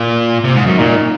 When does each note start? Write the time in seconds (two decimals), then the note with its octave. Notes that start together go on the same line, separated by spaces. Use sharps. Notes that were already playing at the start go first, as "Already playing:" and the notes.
Already playing: A#2 F4
0.44 C3
0.55 G#2
0.66 F#2
0.78 A#2 D#4